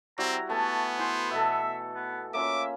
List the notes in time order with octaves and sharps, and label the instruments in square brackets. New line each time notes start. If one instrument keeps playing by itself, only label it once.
[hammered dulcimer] G3 E4 F#4 [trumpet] C4 [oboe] A#5
[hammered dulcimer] A3 G#5 B5 [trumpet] B3 [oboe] A5
[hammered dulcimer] E3 [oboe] C5
[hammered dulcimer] B2 A4 [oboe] E5
[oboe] B3
[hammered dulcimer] A#3 C#4 F4 [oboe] E5 [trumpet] D6